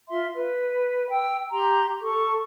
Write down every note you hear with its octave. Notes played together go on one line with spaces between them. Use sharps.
F4 E5 C6
B4
G5 E6
G4 A#5 C6
A4 C#6